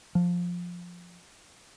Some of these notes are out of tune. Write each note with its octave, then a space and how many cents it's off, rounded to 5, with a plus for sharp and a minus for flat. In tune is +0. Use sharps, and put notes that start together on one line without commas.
F3 +10